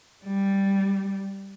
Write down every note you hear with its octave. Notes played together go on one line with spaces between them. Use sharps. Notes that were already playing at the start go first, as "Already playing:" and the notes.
G3